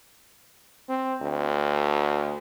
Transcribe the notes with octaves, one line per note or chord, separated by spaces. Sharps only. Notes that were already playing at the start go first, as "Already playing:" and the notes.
C4
D2